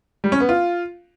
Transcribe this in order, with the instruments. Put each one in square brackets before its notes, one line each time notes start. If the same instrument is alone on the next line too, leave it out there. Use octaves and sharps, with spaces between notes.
[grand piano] G3
C#4
B3
F4